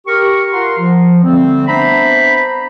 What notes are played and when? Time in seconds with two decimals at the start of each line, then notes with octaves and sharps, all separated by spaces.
0.07 G4 A#4 C#6
0.53 F4 A#4 F#5 A#5 C6
0.79 F3
1.23 D3 G3 A3 C4
1.68 B3 D4 C5 E5 A#5 B5